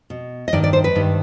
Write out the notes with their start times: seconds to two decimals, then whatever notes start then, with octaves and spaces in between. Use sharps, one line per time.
0.10 B2
0.48 D#5
0.53 G2 D#3 D5
0.64 D5
0.73 C5
0.84 B4
0.95 G2 D#3